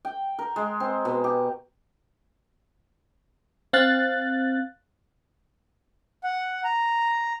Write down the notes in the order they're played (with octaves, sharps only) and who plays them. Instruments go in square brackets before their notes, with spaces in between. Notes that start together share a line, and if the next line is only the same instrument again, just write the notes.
[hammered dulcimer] G5
A#4
G#3
C4
B2
G4
[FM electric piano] C4 F5 F#6 A6
[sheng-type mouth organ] F#5
A#5